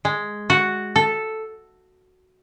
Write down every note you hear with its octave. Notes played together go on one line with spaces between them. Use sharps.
G#3
F#4
A4